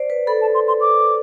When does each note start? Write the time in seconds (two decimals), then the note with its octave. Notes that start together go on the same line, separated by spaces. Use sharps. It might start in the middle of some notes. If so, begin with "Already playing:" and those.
Already playing: C5 D5
0.10 B4
0.27 A4 B5
0.41 A5
0.54 C6
0.68 C6
0.81 D6